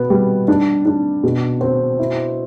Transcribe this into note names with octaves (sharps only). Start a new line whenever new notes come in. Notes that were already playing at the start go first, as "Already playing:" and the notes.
Already playing: B2 B3
G3
D4
D4
B2
C4
E4